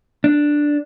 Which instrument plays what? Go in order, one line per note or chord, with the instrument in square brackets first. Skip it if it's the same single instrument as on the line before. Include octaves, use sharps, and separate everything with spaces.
[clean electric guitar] D4